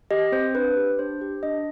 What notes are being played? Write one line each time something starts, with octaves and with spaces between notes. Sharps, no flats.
G4 D#5
C4 C5
D4 B4
G4
D4 C5
G4
D4 D#5